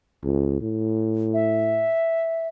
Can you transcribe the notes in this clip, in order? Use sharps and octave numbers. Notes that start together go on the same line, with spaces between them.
C#2
A2
E5